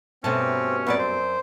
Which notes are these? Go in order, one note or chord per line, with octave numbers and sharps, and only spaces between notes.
G2 B2 A3 C4 C#4 A5
F#2 B3 C4 B4 C#5 D5
C5